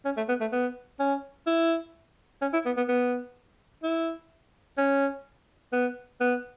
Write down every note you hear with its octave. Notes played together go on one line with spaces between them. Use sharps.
C#4
A3
B3
A3
B3
C#4
E4
C#4
E4
B3
B3
B3
E4
C#4
B3
B3